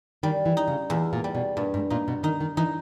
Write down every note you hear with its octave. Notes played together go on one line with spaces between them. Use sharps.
D#3 G3
E3
D#4
C#3
E2 A#2
A#2
G3
B2
G2 A#2
G#2
A#2 D#4
B2
D#3 D#4
D#3
E3 D#4